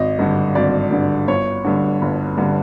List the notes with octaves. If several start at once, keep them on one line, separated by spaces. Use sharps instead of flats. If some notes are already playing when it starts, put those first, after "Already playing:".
Already playing: G#1 D#5
G2 D3
G#1 D5
G2 D3
G1 C#5
G2 D3
G1
G2 D3